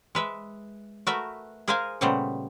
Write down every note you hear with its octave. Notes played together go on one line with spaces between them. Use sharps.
G#3 B4 E5
A3 F#4 A#4 B4 E5
G#4 A#4 C5 D#5 F5 G#5
A#2 C#3 G3 A3 B3 C5